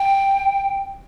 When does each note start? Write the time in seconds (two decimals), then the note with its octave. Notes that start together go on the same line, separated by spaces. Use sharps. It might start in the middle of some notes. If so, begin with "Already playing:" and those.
Already playing: G5